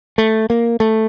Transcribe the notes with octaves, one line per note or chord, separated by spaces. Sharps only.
A3
A#3
A3